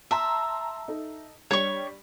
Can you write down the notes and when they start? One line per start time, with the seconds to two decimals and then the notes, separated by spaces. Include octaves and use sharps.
0.11 E5 A5 A#5 C6
0.88 D#4 A4
1.51 G3 D4 C#5 C#6